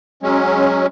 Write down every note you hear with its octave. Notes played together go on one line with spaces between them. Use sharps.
F#3 G#3 C#4